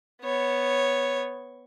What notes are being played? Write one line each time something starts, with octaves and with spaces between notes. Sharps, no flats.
B3 C#5